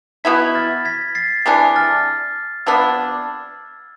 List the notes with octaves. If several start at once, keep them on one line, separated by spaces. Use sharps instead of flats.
B2 B3 E4 G#6 B6
F6 A6
G#6 B6
A6 C7
C3 E3 G#3 D4
F6 A6
C3 F3 B3 D4 E6 G#6